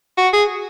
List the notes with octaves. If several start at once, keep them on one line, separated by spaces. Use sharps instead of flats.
F#4
G#4